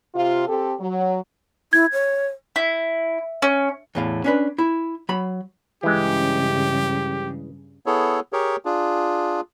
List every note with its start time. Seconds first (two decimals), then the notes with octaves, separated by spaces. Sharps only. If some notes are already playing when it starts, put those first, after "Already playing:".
0.15 C3 F4
0.48 C4 G4 A4
0.80 F#3
1.73 E4 G#6
1.93 C#5
2.56 E4
3.42 C#4
3.95 E2 A2 F5
4.24 C#4 D4 B4
4.58 E4
5.09 F#3 B5
5.83 G2 C#3 E3 G#3 G4
7.86 B3 E4 G#4 A4 C#5
8.33 G4 G#4 A#4 C#5
8.65 D4 F4 G#4